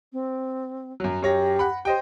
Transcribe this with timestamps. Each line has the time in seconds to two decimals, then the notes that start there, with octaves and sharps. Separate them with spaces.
0.13 C4
1.00 F#2 F#3
1.23 F#2 G4 C#5 A#6
1.59 F#5 B5
1.85 G4 C5 D#5 G5